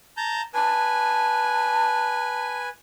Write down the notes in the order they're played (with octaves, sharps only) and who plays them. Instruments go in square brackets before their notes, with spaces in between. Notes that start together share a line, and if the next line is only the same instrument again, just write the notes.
[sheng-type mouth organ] A5 A#5 G6
[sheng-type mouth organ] B4 G#5 [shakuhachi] A5